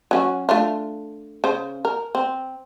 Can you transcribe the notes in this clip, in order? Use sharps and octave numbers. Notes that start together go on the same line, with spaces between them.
F#3 C#4 F#4
A3 D4 F4
C#3 C5
A#4
C4